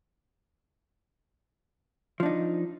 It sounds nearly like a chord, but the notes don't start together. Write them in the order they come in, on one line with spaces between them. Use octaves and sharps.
F3 D4 D#4